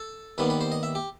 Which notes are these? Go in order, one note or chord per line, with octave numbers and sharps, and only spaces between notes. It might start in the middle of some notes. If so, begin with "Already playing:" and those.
Already playing: A4
D#2 D#3 G3 B3 B4
B4
C5
D#5
E5
G4